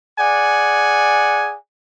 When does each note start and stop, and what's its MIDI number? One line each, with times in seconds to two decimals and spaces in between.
0.19 1.55 68
0.19 1.55 74
0.19 1.55 78
0.19 1.55 80